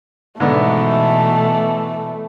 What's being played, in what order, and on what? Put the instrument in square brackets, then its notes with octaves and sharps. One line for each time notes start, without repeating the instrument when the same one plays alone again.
[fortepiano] G#2 D3 B3 [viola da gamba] B2 E3 [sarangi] A3